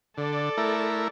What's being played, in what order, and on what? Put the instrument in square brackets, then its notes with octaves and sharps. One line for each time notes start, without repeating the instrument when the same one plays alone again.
[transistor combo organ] D3 [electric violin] A4 D5
[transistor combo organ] A3 E4 A#4